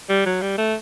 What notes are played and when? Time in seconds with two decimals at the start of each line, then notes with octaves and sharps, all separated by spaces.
0.09 G3
0.26 F#3
0.42 G3
0.58 A3